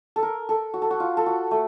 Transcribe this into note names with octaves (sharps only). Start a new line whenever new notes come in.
A4
A#4
A4
F#4
A4
F#4
F4
A4
F#4
A3